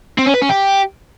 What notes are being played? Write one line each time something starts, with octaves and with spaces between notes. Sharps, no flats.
C4
C#4
B4
C#4
G4